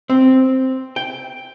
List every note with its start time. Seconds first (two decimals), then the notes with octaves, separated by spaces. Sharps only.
0.10 C4
0.96 G5